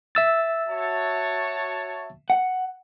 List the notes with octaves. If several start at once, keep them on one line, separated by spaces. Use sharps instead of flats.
E5 E6 A6
F#4 C#5 A5
F#5